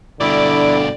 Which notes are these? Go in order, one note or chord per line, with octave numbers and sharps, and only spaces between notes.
G2 B2 D3 E4 D5 D6